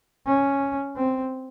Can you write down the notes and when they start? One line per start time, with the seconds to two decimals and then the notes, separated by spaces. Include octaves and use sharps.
0.26 C#4
0.96 C4